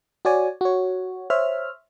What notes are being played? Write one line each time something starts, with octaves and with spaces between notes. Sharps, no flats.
F#4 C#5 D5 G#5
F#4 C#5
C5 C#5 E5 F6